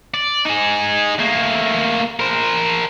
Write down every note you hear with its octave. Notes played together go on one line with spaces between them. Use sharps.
D5
D#4 G#4
A3 A#3
A#4 C5